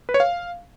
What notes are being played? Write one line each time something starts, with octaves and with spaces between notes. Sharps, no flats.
B4
C#5
F5